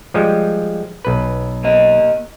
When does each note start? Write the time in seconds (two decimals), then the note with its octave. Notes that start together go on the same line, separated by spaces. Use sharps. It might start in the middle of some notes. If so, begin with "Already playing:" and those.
0.14 F3 G3 G#3
1.05 B1 B4
1.64 A#3 D#5